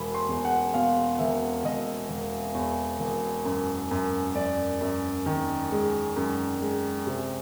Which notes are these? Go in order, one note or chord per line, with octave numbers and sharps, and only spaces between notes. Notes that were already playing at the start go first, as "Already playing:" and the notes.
Already playing: E1 B5
C6
E2
F#5
B2 F5
E1 E5
E1 D#5
E1
E2
E1
F#2
F#2
F#2 D5
F#2
D#3
G#3
F#2
G#3
C3